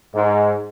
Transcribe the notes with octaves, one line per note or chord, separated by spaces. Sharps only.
G#2